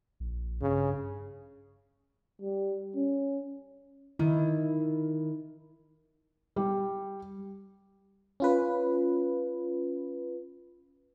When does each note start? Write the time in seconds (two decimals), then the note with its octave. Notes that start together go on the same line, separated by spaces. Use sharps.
0.20 A#1
0.62 G2 C#3
2.42 G3
2.96 C#4
4.19 D#3 E4
6.56 G3
8.40 C#4 F4 B4